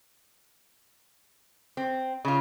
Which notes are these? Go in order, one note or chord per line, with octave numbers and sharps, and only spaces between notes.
C4
C#3 F4